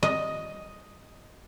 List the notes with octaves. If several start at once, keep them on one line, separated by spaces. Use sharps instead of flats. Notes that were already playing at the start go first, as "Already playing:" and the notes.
D#5